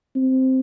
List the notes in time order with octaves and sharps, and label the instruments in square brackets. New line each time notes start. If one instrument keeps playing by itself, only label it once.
[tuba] C4